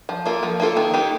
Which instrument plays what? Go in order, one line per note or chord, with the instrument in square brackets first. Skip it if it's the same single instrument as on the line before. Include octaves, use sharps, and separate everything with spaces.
[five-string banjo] F3
A#3 F4 A4
F3
A#3 F4 A4
D#3
A#3 D#4 G4